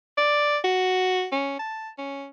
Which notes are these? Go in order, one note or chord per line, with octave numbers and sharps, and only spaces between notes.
D5
F#4
C#4
A5
C#4